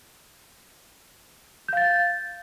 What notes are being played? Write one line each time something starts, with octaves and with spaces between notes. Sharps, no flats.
F5 G6 A6